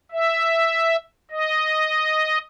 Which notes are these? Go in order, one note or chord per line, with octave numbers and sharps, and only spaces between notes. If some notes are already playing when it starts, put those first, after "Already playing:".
E5
D#5